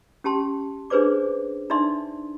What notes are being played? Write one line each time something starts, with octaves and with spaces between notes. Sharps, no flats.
C#4 G4 A5 C6
D4 G#4 B4 C5 D5 D6
D4 D#4 D5 E5 C6